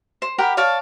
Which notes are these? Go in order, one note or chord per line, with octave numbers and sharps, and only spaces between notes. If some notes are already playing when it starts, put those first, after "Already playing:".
C5
G4 A#4 F#5 B5
C#5 D5 F5 A5